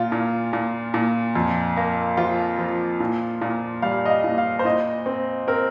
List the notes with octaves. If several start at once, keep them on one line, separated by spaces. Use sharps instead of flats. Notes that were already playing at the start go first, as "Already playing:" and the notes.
Already playing: A#2 F4
A#2
A#2
A#2
F2
A#3
F3 F4
F3
A#2
A#2
G3 F5
D#5
F5
A#2
F5
C5
A#2 D#5
C4
C4 A#4